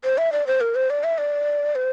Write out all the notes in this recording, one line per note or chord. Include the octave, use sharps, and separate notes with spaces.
C5
E5
D5
C5
A#4
C5
D5
E5
D5
C5